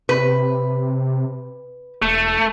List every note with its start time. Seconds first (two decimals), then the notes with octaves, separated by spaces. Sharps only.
0.09 C3 B4
2.02 E1 A3